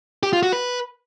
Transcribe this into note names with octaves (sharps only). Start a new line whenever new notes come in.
G4
F4
F#4
B4